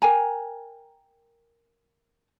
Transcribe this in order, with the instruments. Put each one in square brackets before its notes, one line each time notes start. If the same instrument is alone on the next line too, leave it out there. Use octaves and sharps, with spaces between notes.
[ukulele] A#4 G5 G#5 A#5